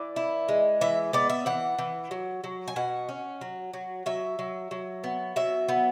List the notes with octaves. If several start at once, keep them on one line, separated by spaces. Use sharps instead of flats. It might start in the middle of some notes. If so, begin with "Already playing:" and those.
Already playing: E3 D5
E4
G#3
E3 E5
B3 D5
E5
E3 F#5
E3
F#3
F#3
G#5
B2 F#5
C#4
F#3
F#3
F#3 E5
F#3
F#3
B3
F#3 E5
B3